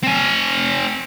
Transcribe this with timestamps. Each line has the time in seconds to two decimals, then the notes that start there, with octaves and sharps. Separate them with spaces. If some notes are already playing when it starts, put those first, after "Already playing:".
0.03 C4 G#5